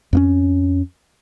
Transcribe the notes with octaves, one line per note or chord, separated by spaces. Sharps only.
F2 A#3 C#4